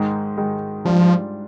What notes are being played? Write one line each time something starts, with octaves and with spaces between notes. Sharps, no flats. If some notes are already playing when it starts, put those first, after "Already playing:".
Already playing: G#2 D#3 G#3 D#4
G#2 D#3 G#3 D#4
G#2 F3 G3 D4 F4